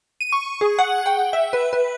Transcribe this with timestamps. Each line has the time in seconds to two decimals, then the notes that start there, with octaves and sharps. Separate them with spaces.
0.21 D#7
0.32 C#6
0.61 G#4
0.79 F#5
1.06 G5
1.33 E5
1.53 B4
1.73 B4